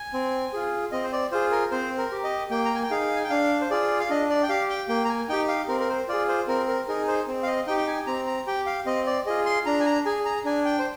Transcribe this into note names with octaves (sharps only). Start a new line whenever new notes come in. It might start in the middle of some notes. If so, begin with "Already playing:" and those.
Already playing: G#5
C4
F4 G#4
C4 D#5
C5
D5
F4 G#4 C5
A#4
C4 C5
A#4
G4
D#5
A#3 G5
A#5
G#5
G5
D#4 G#4 F5
G#5
G5
D4 F5
C5
F4 G#4 D5
F5
D4 D#5
D5
G5
G4 F5
G5
A#3 G5
A#5
G#5
D#4 G4 G5
F5
C4 A#4
A#4
C5
F4 G#4 D5
C5
C4 A#4
A#4
D#4 G#4 A#4
C5
C4
F5
D#5
D#4 G4 G5
G5
G#5
C4 A#5
A#5
G4 G5
F5
C4 D#5
D5
F4 G#4 D#5
C6
D4 A#5
G#5
A#5
G#4 G#5
A#5
D4 G#5
G5
C5